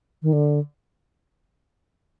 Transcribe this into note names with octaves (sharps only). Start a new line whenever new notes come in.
D#3
D3